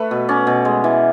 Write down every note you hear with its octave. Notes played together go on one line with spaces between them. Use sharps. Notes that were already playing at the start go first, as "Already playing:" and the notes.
Already playing: A3 B4
B2
C#4 D5
B2
G#3
E3